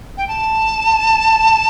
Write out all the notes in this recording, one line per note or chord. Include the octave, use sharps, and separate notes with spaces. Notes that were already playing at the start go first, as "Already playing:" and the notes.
G5
A5